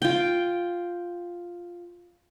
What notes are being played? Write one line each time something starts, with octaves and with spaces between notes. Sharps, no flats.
F4 G5